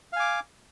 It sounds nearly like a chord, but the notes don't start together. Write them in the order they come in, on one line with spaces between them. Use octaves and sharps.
F5 G#5 D6